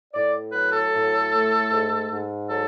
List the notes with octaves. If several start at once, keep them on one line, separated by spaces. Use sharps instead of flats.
A2 D5
F#3 B4
A4
A2
A3
G#2
G#2
F#3 A4